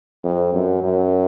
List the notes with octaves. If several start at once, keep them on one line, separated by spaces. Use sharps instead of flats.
F2
F#2
F#2